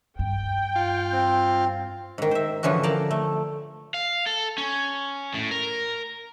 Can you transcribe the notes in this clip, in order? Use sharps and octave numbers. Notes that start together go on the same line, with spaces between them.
G2 G5
F4
C4
G#2 D#3
C5 E5
D3 E3 F3 C#4 F#4
A#4 D5 F5 G5 A5
A3
F5
A4
C#4
A2
A#4